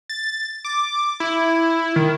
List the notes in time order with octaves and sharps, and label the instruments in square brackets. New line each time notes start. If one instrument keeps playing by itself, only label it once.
[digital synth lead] A6
D6
E4
D#3